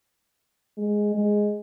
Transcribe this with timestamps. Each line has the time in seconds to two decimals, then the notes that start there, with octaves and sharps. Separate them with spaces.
0.78 G#3
1.14 G#3